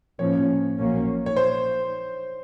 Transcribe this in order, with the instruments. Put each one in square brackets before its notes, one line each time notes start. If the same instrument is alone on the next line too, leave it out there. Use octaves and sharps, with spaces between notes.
[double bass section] A2 F3 A#3 C#4 [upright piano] C#5
[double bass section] A#1 A#2 F#3 A#3 C#4
[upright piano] C#5
C5